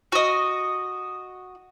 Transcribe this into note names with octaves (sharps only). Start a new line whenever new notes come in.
F#4 D#5